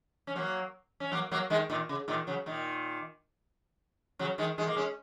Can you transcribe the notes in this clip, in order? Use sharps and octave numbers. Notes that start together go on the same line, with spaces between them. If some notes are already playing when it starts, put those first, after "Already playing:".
C#4
F#3 A#3
C#4
F#3 A#3
F#3 A#3
D#3 G#3
A#2 D#3
C#3
A#2 D#3
C#3 F#3
A#2 D#3
C#3 F#3
D#3 G#3
D#3 G#3
A#3
G#3 C#4